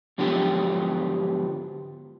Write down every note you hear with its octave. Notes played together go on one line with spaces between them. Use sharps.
G#2 D3 F3 F#3 B3 G4